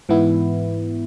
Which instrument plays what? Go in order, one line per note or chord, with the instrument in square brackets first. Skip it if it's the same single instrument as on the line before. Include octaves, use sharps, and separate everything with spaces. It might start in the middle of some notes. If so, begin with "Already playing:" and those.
[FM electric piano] G#2 E3 B3 E4